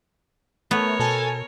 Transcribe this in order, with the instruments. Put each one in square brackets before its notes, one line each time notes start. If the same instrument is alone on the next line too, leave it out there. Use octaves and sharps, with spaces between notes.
[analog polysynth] A3 [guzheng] B3 [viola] A#4 C#5
[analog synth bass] B2 [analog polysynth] A4 G#5 A5